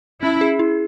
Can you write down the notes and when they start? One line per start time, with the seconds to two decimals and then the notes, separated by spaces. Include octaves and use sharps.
0.23 C#4 E4
0.41 G#4
0.59 E4